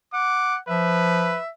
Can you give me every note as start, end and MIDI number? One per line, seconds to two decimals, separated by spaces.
0.14 0.58 78
0.14 0.57 86
0.69 1.37 53
0.69 1.40 71
0.69 1.49 76